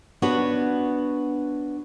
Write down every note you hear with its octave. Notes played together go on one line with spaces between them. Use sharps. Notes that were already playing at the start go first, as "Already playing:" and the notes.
B3 D4 F#4 B4 C#5